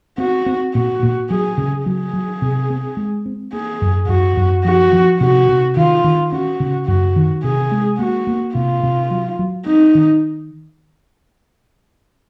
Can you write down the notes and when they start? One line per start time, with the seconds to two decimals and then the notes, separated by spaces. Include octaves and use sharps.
0.18 C4 F#4
0.46 C4
0.74 A#2 F#4
1.03 A#2
1.30 F#3 G#4
1.58 C#3
1.86 F#3 G#4
2.13 F#3
2.42 C3
2.70 C4
2.97 G#3
3.26 C4
3.53 A#3 G#4
3.82 F#2
4.08 F#2 F#4
4.37 F#2
4.65 F3 F#4
4.93 F3
5.20 C3 F#4
5.49 C3
5.77 D#3 F4
6.04 D#3
6.32 C#4 F#4
6.60 C#3
6.87 F#2 F#4
7.16 D#3
7.44 C3 G#4
7.72 G#3
7.99 A#3 F#4
8.27 A#3
8.55 C3 F4
8.83 C3
9.11 F#3
9.39 F#3
9.66 C4 D#4
9.95 D#3